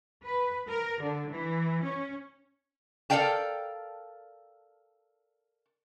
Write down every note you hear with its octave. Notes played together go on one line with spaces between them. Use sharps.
B4
A#4
D3
E3
C#4
A4 A#4 D5 F5 G5 A5